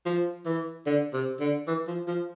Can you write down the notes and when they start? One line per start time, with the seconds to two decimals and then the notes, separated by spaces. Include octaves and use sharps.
0.06 F3
0.46 E3
0.86 D3
1.13 C3
1.40 D3
1.67 E3
1.88 F3
2.08 F3